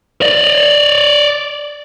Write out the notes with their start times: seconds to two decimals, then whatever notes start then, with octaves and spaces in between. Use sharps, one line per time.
0.22 D5 D#5